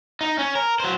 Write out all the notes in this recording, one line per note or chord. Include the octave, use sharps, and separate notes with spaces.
D#4
C#4
A#4
F#3 C5